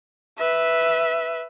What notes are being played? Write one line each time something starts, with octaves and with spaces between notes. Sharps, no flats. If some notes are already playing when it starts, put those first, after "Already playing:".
B4 E5